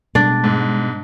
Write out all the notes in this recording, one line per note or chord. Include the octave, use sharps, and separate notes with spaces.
B2 G3 G#3 D4 D5
G#2